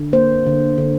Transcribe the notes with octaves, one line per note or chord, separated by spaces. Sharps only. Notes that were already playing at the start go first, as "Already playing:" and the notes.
Already playing: D3
A#3 C5
D3
D3